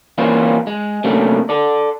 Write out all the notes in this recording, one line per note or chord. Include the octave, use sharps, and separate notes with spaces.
E3 G3 A#3 C4 C#4 F4
G#3
C3 F#3 A3 A#3 C#4 D4
A4 D5